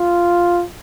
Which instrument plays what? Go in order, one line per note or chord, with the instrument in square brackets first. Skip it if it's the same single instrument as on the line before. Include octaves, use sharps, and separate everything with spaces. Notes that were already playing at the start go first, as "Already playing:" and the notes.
Already playing: [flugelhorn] F4